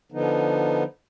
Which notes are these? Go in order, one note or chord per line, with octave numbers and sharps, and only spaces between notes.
D3 F3 B3 D#4